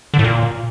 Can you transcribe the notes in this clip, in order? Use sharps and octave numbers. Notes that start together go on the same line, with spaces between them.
D3
A2
A#2